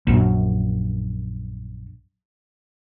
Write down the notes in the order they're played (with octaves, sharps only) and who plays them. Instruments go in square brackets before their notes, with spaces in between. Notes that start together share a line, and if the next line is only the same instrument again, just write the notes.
[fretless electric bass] A#1 F#2